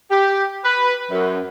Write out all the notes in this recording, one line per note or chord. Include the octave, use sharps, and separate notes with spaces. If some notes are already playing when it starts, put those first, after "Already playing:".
G4
B4
F#2